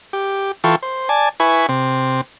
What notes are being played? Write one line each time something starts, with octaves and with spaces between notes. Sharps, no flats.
G4
E3 F4 A4 G5 C#6
C5
D5 G#5 A5
E4 B4 G#5 C#6
C3 C4